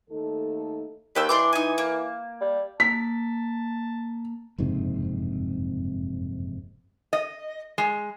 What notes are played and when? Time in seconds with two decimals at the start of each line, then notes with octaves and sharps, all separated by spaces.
0.10 D#2 A3 D#4 A4
1.15 D#2 B4 G5 E6
1.29 E3 D4 C6 D6
1.53 D#4 G#5
1.78 A#3
2.41 G3
2.80 A#3 A5 B6
4.58 F#1 F2 G#2 C3
7.13 D#5
7.78 G#3